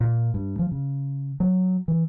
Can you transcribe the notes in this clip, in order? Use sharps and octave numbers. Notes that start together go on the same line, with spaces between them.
A#2
G2
F3
C#3
F#3
E3